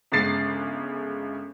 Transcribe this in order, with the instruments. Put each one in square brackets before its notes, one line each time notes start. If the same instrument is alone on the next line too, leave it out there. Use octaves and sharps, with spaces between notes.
[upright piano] G1 C#3 G#3 A6 C7